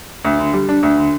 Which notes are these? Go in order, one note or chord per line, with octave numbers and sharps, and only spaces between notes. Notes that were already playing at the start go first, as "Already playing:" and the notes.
D2
D3
G3
D4
D2
D3